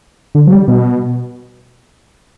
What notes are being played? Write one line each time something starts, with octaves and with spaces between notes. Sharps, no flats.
D3
F#3
G3
B2